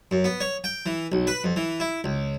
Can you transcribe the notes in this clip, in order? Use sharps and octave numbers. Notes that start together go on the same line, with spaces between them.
F#2
B3
C#5
G5
E3
B1
B4
F2
E3
E4
C#2